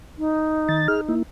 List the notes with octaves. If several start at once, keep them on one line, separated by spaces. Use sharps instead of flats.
D#4
D#3 A6
G#4 F6
A#3 E4